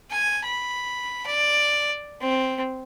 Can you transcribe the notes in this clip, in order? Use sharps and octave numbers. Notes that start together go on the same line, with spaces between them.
G#5
B5
D5
C4